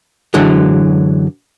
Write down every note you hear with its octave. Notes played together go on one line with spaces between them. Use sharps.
F#2 D3 E3 F#3 G#3